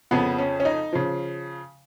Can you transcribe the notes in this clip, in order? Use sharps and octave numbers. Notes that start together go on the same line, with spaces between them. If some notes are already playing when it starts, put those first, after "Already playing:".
F2 C#3 F3 B3
C#4
C#4
D#4
C#3 F3